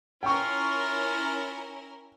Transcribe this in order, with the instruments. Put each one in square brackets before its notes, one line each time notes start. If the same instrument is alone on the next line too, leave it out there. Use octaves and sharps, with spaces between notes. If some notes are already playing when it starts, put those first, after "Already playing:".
[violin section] C#4 E4 A#4 [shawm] F4 [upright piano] G5 C#6